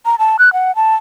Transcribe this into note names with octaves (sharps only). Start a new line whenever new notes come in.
A#5
A5
F#6
F#5
A5